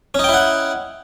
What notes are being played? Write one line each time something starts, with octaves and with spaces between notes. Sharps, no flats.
C#4 D#4 E4 F#5 G5